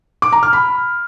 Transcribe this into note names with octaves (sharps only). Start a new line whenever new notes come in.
D6
A#5
F6
B5